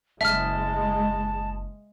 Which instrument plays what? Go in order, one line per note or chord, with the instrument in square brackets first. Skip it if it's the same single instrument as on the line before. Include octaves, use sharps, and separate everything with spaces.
[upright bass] F#1 [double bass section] G#3 [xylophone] E5 F6 [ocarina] A5